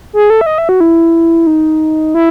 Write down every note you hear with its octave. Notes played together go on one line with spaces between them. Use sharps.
G#4
A4
E5
D#5
E5
F#4
E4
D#4
E4